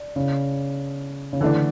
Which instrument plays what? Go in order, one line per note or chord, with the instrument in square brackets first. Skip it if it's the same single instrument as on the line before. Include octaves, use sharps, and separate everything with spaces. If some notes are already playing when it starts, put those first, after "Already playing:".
Already playing: [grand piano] D4
[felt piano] C#3
C#3
[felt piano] D3 [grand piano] E3 A3 D4